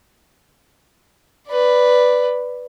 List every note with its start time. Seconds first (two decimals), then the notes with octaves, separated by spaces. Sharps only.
1.48 B4 D5